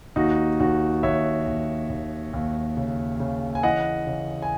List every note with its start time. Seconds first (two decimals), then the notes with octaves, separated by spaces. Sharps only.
0.16 D#2 D#4 F#4
0.60 D#2 D#4 F#4
1.03 D#2 C#5 E5
1.47 D#2
1.90 D#2
2.33 D#2
2.77 C#3
3.20 C#3
3.55 G#5
3.63 E3 D#5 F#5
4.07 C#3
4.42 G#5